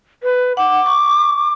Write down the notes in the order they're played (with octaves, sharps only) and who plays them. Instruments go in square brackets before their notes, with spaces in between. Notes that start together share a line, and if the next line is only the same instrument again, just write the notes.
[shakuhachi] B4
[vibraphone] F#5 [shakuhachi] D6
[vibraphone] C#6